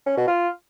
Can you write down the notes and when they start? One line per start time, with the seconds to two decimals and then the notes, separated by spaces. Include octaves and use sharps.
0.06 C#4
0.17 B2
0.27 F4